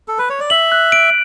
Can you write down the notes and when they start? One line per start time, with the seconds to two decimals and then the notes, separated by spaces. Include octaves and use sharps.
0.08 A4
0.18 B4
0.30 C#5
0.40 D5
0.50 E5 F#7
0.72 F#6
0.92 D7